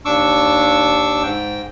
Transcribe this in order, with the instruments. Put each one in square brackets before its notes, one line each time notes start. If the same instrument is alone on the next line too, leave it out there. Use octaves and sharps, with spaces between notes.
[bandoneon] D#2 D4 C#6 D6 E6
G#2 G5